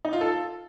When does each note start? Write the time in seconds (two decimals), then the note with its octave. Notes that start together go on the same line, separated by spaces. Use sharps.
0.05 D#4
0.13 F4
0.21 A4